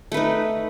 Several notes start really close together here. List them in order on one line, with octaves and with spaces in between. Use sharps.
A3 B4 D#4